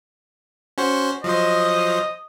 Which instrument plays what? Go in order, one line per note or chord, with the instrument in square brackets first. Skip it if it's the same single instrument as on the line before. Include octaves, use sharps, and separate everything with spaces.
[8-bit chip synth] C#4 F#4 C5
[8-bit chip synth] F3 F#3 C5 [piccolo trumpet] D#5